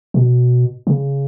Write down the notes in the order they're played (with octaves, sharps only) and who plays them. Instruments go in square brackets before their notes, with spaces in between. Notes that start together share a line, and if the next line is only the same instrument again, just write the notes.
[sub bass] B2
C#3